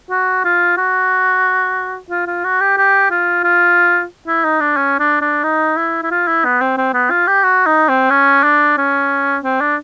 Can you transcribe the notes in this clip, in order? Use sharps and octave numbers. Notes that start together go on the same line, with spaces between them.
F#4
F4
F#4
F4
F4
F#4
G4
G4
F4
F4
E4
D#4
D4
C#4
D4
D4
D#4
E4
E4
F4
E4
B3
C4
C4
B3
F4
G4
F#4
D#4
C4
C#4
D4
C#4
C4
D4